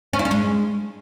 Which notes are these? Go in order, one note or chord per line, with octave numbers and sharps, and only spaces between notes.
C#4
E4
C#4
G#3